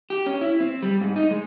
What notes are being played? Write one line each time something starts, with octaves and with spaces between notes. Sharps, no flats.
G4
C#4
E4
C4
G3
G#2
D#4
G#3